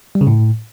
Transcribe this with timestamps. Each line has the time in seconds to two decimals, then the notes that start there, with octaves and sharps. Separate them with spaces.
0.15 G3
0.21 C#3
0.27 A2